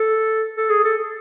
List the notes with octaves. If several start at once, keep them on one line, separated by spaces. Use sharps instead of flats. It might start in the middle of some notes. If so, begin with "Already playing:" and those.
Already playing: A4
A4
G#4
A4